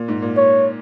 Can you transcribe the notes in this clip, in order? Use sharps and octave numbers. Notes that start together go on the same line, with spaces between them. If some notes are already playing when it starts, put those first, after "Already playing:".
Already playing: A#2
G#2
A#2
C#5